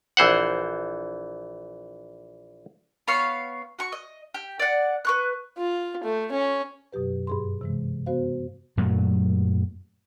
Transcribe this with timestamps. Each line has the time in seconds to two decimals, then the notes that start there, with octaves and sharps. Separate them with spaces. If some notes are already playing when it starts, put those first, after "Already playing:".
0.17 A#1 E3 C5 F#5
3.08 B3 C#5 F5 C#6
3.79 F#4 C#6
3.92 D#5
4.34 G4
4.59 D5 F#5
5.05 B4 C#6 F#6
5.58 F4
6.04 A3
6.32 C#4
6.92 F#2 B2 F#3 G4 B4
7.27 G2 G#4 C6
7.61 C3 E3 G#3
8.06 B3 F#4 C5 F5
8.77 F#2 A#2 F#3 A3